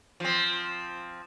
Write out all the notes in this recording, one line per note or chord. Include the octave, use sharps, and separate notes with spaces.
F3 C4